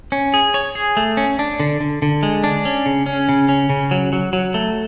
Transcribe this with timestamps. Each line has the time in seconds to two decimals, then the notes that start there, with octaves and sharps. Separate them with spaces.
0.12 C#4
0.34 G#4
0.54 C#5
0.75 G#4
0.97 A3
1.17 C#4
1.39 D4
1.60 D3
1.81 D3
2.02 D3
2.23 G#3
2.44 D4
2.65 C#4
2.86 C#3
3.06 C#4
3.29 C#3
3.49 C#4
3.70 C#3
3.91 F#3
4.13 F#3
4.33 F#3
4.54 A3